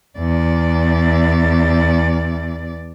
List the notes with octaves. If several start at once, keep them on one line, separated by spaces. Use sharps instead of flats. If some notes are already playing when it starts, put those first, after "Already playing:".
E2 D5